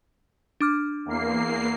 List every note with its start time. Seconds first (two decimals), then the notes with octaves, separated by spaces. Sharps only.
0.61 D4 D6 F6
1.06 E2 A#3 C7